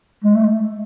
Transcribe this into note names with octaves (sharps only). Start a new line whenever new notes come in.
G#3
A3